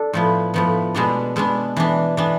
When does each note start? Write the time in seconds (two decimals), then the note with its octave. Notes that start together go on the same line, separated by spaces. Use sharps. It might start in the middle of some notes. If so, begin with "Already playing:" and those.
Already playing: D4 A4
0.13 A2 F3 B3
0.54 A2 F3 B3
0.94 B2 G#3 B3 D4
1.36 B2 G#3 B3 D4
1.76 E3 B3 D4
2.17 E3 B3 D4